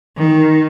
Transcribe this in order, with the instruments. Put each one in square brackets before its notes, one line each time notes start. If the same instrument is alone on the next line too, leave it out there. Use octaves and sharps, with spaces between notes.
[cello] D#3